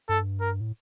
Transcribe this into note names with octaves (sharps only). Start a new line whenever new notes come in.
G2 A4
A#4
A2